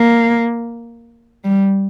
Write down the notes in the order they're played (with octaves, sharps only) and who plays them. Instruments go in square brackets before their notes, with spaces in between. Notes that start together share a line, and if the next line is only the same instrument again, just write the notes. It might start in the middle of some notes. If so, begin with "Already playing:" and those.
Already playing: [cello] A#3
G3